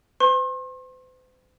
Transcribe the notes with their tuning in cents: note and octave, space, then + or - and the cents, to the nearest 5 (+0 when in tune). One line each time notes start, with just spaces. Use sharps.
C5 -45 C6 +40